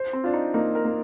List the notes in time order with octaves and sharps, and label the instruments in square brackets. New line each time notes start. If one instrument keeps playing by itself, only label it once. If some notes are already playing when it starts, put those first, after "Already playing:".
Already playing: [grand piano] C5
[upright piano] C4
[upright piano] D4 [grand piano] F4
[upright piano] D#4
[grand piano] A#3 [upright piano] D#4
[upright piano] A#4
[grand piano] A#3